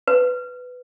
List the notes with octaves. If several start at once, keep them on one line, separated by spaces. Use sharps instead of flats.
B4